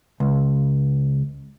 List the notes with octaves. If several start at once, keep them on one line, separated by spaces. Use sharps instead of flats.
C#2